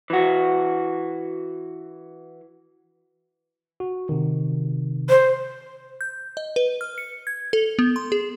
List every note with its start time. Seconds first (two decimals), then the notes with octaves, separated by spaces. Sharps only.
0.10 E3 F#4
3.80 F#4
4.09 C3 D#3
5.09 C5
6.01 G6
6.37 D#5
6.56 B4
6.81 F6
6.98 C#7
7.27 G#6
7.53 A4
7.79 B3
7.96 C6
8.12 G#4